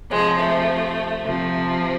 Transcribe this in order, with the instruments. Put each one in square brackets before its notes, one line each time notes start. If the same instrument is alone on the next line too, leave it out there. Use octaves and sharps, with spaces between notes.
[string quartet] C3 F3 G#3
A3
C3 F3